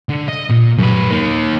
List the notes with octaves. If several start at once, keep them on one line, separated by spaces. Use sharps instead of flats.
D3
D#5
A#2
F#2 B4
A#3 D#4